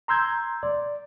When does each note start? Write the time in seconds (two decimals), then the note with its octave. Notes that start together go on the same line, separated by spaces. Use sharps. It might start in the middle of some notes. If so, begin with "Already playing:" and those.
0.08 A#5 C6 E6 G6 G#6
0.63 D5